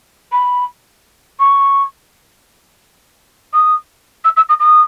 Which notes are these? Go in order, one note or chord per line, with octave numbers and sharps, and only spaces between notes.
B5
C#6
D#6
E6
E6
D#6
D#6